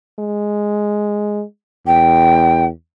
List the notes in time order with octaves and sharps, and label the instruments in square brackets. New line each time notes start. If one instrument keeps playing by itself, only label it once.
[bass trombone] G#3
[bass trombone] E2 [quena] G5